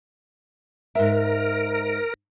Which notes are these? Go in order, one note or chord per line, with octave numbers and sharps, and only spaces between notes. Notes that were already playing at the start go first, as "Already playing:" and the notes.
G#2 A#4 E5